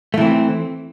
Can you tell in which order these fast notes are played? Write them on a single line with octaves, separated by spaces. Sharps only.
A3 E3 C4